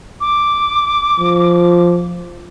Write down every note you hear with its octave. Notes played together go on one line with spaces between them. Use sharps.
D6
F3